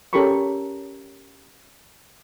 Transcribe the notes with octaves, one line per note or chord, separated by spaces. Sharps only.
C#4 G4 A4 A#4 B5 C#6